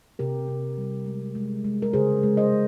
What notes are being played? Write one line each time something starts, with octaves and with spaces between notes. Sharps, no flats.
C3 G4 A#4
C3
G3
G#3
G#3
G#3
A#4
C#3 G#4 C5
G#3
C5 D#5
C#3